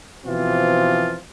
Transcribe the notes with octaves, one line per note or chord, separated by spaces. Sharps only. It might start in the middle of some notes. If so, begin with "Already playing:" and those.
B2 E3 F3 C4 F4